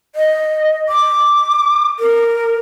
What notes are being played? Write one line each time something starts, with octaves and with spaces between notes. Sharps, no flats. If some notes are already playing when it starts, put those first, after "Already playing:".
D#5
D6
A#4